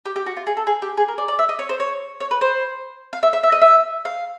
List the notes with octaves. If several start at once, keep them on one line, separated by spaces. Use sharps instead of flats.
G4
G4
F#4
F4
G#4
A4
G#4
G4
G#4
A#4
D5
D5
E5
D#5
C#5
C5
C#5
C#5
B4
C5
F5
E5
E5
E5
D#5
E5
F5